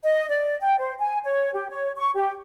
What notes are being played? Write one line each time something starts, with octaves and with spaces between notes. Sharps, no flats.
D#5
D5
G5
C5
G#5
C#5
G4
C#5
C#6
G4